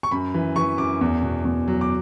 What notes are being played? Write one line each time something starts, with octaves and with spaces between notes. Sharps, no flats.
C#6
F#2 B5
E3
E3 C#6
F#2 D6
E2
B2
E2
F#3
D6